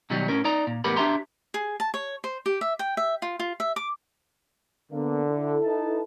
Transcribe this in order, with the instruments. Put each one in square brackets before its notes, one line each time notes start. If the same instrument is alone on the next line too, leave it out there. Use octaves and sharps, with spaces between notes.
[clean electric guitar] B2 D#3 F#3 G3 D#4
A2 C#4 A#4
D#4 D5 A#5
A#2
E2 A2 B3 G4 A#4 B5
D4 G4 E5 A#5 C6
[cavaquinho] G#4
A5
C#5
C5
G4
E5
G5
E5
F4
F4
E5
D6
[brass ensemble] D3 [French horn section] A#3 B3
[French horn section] E4 A4
[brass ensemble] D#4 B4 A5